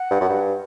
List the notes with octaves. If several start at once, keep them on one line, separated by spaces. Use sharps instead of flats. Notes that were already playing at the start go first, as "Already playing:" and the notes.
Already playing: F#5
G2
F#2
G2